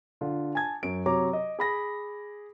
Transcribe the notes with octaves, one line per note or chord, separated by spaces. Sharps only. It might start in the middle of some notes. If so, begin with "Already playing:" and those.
D3 F4
G#5 A5 G#6
F#2 D7
C3 F#3 C#5 A#5 D6
D#5
G#4 B5 A#6